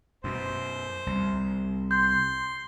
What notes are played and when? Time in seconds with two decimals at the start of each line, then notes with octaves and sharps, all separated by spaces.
0.24 F#2 B2 C5
1.07 C2
1.91 C6 G6